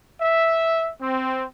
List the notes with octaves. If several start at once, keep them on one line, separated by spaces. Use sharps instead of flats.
E5
C4